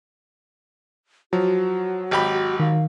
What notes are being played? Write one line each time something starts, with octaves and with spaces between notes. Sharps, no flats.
F3 F#3 F#4
G#1 G4 B5
D#3 F5